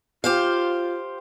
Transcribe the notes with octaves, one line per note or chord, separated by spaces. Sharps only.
F4 G4 C5 F5